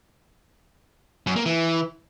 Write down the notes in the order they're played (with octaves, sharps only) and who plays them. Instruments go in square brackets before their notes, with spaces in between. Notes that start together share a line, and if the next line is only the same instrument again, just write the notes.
[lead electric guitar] F#2
A#3
E3